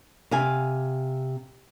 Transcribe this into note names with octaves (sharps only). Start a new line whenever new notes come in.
C3 F5 G#5